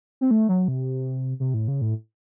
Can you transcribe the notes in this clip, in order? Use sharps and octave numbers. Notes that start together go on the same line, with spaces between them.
C4
A3
F#3
C3
C3
A2
C#3
A2